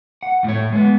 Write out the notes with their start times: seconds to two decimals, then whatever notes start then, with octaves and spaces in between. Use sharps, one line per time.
0.23 F#5
0.44 A2 C#5
0.73 G#3 B3